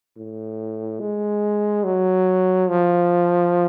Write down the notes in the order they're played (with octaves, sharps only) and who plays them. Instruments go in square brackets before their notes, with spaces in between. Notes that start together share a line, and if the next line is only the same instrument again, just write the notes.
[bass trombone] A2
G#3
F#3
F3